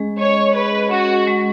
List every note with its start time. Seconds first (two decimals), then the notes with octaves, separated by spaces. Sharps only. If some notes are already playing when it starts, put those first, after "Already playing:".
Already playing: G#3 C#4 G#4 D#5
0.19 C#5 D#5
0.55 G#4 B4
0.91 C#4 F#4
1.27 G#3